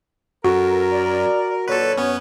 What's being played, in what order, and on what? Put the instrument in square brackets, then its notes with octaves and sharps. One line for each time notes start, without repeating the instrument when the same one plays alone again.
[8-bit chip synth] F#2 [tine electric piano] F#4 [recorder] A4 [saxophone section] A#4
[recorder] D5
[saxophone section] A#2 D3 F#3 [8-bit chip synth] A4 B4 [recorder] C#5
[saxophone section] F#2 [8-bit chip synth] B3 C#4